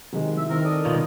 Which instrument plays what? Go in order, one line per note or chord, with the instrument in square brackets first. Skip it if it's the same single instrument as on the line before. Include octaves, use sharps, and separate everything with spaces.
[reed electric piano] C3 D#3 G#3 [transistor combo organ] F#3
[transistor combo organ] E4 [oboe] E5
[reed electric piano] D#3 C4 [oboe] A#4
[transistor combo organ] A4 A#4 D5 [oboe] D#5
[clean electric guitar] C#2 B2 D#3 [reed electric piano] B3 F4 C#5